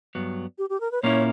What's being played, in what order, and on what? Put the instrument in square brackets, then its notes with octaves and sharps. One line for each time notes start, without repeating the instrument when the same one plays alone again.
[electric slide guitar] G2 F#3 B3
[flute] G4
G4
A#4
B4
[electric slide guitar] A#2 A#3 C#4 E4 [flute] C#5